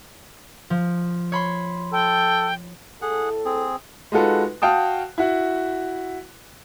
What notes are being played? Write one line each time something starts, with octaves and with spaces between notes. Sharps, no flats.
F3
C#5 B5 C6
A4 G5
A2 G#4 A4 F#5
C4 G#4
G#3 D#4 F4 F#4 A4 B4
F#4 F5 G5 A5 D#6
E4 F#4